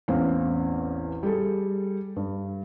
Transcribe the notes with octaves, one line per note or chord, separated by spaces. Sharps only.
A1 E2 C4 C#4 F5
G3 G#4 A4
G2